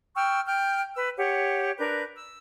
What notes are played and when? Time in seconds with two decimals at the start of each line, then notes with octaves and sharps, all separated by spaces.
0.15 G5 C#6 E6 F6
0.45 G5 F6 G6
0.95 B4 E6
1.17 G4 C#5 F#5
1.78 D4 A#4 B4 G6
2.16 E6